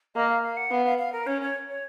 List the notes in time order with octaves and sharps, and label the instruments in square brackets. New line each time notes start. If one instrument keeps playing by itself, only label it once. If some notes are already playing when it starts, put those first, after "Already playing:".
[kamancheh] A#3 [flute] D#5
[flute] F5
F5
F#5
[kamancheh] B3 [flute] F5
[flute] F5
F5
A#4
[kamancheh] C#4 [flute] C#5
[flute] C#5
C#5